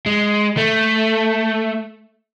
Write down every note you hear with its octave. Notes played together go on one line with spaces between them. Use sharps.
G#3
A3